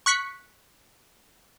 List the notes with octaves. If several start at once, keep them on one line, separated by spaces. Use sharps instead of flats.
C#6 F#6 B6 C#7